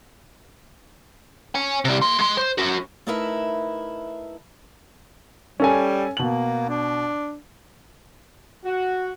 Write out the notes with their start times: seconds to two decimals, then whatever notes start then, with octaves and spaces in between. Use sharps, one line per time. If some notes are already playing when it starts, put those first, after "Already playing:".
1.55 C#5 G#5
1.85 C3 G3
2.02 A#3 C6
2.19 G#3 C6
2.37 C5
2.58 C#4 F#4
3.07 A3 D#4 E4 A#4 B4 E5
5.60 G3 C#4 A4 G#5
6.17 B2 A#3 F#7
6.69 D4
8.65 F#4